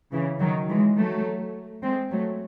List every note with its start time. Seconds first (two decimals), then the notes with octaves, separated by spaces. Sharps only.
0.12 C#3 E3
0.40 D#3 F#3
0.68 E3 G#3
0.97 F#3 A3
1.82 G#3 C4
2.11 F#3 A3